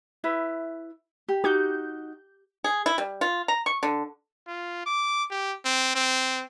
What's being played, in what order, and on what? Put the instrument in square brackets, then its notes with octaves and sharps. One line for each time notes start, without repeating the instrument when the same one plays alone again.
[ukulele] E4 B4 E5
G4
[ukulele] D#4 F#4 [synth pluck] G4 G6
[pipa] G#4
E4
G3
F4
A#5
C#6
D3
[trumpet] F4
D6
G4
C4
C4